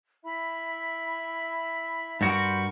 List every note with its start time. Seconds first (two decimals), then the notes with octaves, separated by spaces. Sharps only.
0.23 E4 E5 B5
2.21 G2 F#4 A#4 B5 C6 G6